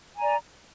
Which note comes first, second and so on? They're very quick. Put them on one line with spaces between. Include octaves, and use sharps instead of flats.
G#5 A#5 D5